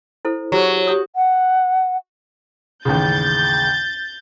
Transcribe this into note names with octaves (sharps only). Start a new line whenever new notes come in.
E4 A4 C5
F#3 G4 G#4 C5
G4 C#5 D#6
F#5
A1 D#2 C#3 G6 A6